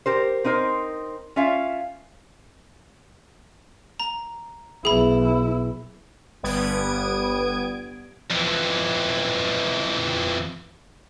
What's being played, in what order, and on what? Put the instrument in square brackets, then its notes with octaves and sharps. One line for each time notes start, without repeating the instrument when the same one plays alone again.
[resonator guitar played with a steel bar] G4 A#4 C5
C4 D#4 A#4 C5
C#4 F4 E5 F5
[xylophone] A#5
[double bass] B1 E4 [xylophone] G#4 B5
[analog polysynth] G1 G3 B3 D#6 G#6 D7
[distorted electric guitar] F2 E3